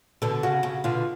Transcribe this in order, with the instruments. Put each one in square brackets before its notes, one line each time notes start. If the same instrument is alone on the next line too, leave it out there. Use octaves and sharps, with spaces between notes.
[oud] B2 D3 [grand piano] A4
[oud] C#3 [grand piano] F#4
[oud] C#3 [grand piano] F#4
[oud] B2 D3 [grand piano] F4